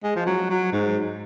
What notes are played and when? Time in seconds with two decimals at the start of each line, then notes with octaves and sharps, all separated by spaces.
0.04 G#3
0.16 F3
0.27 F#3
0.50 F#3
0.73 G#2